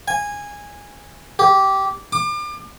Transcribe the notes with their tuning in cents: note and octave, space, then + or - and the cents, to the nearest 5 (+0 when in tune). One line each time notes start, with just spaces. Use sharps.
G#5 -15
G4 -15
D6 +35